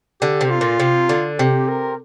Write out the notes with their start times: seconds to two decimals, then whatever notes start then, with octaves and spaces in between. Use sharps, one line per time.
0.22 D3 G4
0.41 C3
0.50 F4
0.61 A#2
0.80 C3
1.09 D3
1.39 C3 G4
1.69 A#4